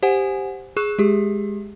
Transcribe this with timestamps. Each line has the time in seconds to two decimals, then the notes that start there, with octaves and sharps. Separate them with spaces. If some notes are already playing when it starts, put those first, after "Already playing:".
0.03 G4 C5 F#5 G#5
0.76 G#4 C#6 F#6 E7
0.99 G#3 G4 G#4